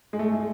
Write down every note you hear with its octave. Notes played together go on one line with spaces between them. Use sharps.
G#3
A3
G#3